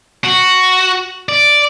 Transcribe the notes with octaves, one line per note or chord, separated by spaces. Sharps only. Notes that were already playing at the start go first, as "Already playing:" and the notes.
F#4
D5